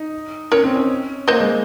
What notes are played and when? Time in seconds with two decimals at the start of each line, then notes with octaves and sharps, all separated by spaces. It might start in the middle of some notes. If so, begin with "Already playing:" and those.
Already playing: D#4
0.52 C#4 A#4 C#5
0.63 C4
0.75 C#4
1.28 A#3 C5 D#5
1.40 G#3